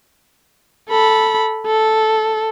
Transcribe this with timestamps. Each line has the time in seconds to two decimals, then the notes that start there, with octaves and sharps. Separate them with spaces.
0.89 A4 B5
1.66 A4